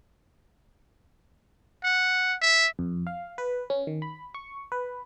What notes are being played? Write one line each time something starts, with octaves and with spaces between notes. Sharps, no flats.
F#5
E5
F2
F5
B4
C#4
D#3
B5
C#6
B4